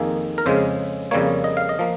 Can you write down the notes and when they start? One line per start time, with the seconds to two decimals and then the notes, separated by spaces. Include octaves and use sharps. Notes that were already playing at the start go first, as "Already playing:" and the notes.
Already playing: F2 D#3 A#3 G#4
0.38 A#4
0.46 F2 C#3 G#3 C5
1.11 F2 C#3 G3 A#3 C#5
1.44 D#5
1.57 F5
1.69 D#5
1.79 F3 A#3